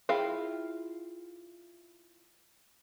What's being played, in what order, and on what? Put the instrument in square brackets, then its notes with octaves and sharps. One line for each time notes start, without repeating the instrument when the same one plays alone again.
[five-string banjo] E4 F4 F5 [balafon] G#4 G5